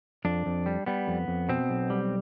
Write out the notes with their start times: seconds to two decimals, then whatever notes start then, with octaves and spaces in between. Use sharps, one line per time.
0.25 F2 D4
0.46 F2
0.66 G3
0.86 G3 B3
1.08 F2
1.28 F2
1.49 B2 C4
1.70 B1
1.90 G3